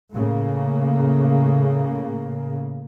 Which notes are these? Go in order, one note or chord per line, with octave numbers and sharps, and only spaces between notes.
A2 C#3 A#3